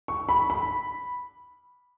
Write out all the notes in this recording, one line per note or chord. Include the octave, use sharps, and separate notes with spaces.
C#6
B5
B5